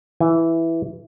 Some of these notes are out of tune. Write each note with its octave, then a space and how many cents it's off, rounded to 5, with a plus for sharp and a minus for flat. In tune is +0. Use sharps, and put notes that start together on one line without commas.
E3 +0 G#5 +0